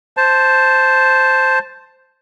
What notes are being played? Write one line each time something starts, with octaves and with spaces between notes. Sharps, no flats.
C5 A5